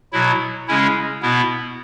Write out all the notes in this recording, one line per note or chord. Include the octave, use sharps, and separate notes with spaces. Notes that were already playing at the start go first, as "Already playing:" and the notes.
B2 F#3 E4
C#3 G#3 C#4 E4
B2 B3 E4